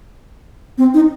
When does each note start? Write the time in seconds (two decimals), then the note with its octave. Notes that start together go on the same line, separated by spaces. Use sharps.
0.78 C4
0.94 D#4